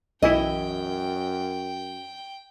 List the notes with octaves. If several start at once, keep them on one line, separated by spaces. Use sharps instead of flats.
B1 F#2 E3 E4 D#5 G5